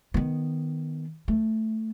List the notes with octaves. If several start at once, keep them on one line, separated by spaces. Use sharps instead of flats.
D#3 B3
A3